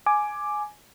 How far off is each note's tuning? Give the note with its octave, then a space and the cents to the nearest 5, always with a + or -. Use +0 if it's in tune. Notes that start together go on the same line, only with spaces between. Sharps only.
G#5 +10 D6 +5